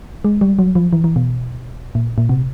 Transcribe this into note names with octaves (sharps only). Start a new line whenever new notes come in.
G#3
G3
F#3
F3
E3
E3
B2
A#2
A#2
C3